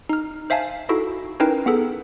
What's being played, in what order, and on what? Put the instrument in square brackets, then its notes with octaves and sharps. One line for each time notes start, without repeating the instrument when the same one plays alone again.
[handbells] D#4 F6
C5 E5 F5 G#5 A5
D#4 E4 F#4 A4
C#4 D#4 E4 A#4 B4 G5
B3 G#4 A4